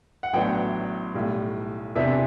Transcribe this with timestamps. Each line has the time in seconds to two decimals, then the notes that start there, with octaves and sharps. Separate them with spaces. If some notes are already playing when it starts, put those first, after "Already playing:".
0.23 F#5
0.33 A1 A2 F#3 B3 D4 G5
1.15 B1 A2 G3
1.95 E2 C3 E3 B3 D4 E5